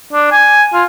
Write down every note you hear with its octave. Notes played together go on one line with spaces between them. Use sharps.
D4
G#5
F4